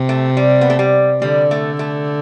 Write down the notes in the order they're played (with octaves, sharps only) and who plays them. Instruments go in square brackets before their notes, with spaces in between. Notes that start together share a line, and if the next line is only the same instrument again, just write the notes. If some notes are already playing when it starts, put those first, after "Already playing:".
Already playing: [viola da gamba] C3
[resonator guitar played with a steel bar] A3
G3
B3
A3
G3
[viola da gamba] D3 [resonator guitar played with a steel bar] G3
[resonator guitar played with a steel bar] A3
A3